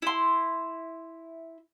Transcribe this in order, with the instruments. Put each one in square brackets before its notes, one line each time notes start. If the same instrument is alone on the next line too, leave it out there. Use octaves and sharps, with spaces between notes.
[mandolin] E4 C6